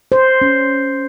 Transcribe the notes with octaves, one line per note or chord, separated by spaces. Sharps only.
C5
C#4